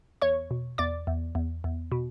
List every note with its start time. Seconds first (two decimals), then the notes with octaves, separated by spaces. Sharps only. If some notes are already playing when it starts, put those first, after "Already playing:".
0.22 E2 C#5 C#6
0.51 B2
0.78 E2 D5 D6
1.07 E2
1.35 E2
1.64 E2
1.92 B2